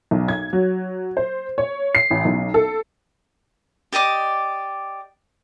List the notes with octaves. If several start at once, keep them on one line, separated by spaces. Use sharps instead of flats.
B1
G#6
F#3
C5
C#5
C7
A1
B1
A4
G4 D5 D#5 D6